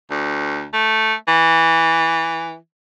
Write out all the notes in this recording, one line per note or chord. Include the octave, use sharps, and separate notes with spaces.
D2
A3
E3